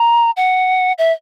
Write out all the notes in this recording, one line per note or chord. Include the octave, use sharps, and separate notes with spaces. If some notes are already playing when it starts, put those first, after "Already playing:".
Already playing: A#5
F#5
E5